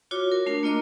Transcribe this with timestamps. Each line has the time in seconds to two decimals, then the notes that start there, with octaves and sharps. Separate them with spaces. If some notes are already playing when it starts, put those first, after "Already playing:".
0.11 F4 F#4 C#5 D6
0.32 A#4
0.46 A3 D4 A#4
0.63 A#3 F4 D#5 D6